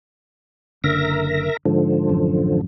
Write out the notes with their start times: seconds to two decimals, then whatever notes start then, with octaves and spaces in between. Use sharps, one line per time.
0.84 F#1 D3 A#4 E5 A#6
1.66 G#2 D3 F3
2.09 A1 F#2